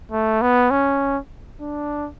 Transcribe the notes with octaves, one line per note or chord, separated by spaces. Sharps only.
A3
B3
C#4
D4